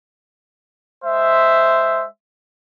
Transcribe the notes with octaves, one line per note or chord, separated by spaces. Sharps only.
G#3 C5 E5